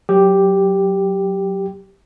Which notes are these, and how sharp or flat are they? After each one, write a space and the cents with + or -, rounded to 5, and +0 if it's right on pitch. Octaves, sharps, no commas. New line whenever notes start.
F#3 +0 G4 +0